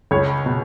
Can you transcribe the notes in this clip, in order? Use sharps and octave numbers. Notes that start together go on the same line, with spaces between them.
C#2 C#5
B2